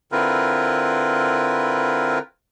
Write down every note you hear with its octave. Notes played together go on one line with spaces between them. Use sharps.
D3 C4 E4 F4 A#4 B4